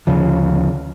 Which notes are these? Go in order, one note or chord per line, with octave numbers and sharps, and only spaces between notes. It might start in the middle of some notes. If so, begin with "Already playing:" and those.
D2 C#3 F3